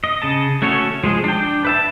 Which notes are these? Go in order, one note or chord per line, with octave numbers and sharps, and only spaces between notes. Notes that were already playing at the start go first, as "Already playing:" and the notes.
D#5
C#3 D#5 A5
A3 C#4 F#4 A4 C#5
F3 G#3 G#4
D4 G5
B4 E5 A5